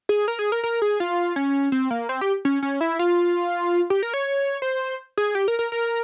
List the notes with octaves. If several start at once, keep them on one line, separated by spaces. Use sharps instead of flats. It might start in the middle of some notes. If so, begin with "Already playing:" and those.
G#4
A#4
G#4
A#4
A#4
G#4
F4
C#4
C4
A#3
C4
G4
C#4
C#4
E4
F4
G4
A#4
C#5
C5
G#4
G4
A#4
A#4
A#4